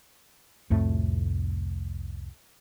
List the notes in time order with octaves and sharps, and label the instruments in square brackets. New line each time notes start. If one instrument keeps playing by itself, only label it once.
[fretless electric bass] C2 F2 A2 A3